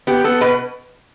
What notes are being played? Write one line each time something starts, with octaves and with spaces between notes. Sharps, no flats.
B3 G4
B3 A4
B2 B4